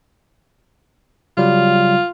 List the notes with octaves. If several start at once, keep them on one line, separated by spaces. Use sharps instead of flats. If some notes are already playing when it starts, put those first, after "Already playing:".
C#3 F#3 G3 F4